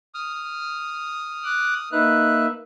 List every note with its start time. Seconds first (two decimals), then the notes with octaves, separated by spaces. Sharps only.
0.14 D#6 F6
1.44 D6 F#6
1.92 A#3 D#4 B4 E5 F#6